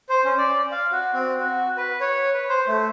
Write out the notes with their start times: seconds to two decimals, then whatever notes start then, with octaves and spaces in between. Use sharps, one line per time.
0.09 C5
0.24 C#4
0.38 D5
0.71 F5
0.92 F#4
1.14 C4
1.39 F#4
1.77 B4
2.01 C#5
2.34 B4
2.49 C5
2.67 A3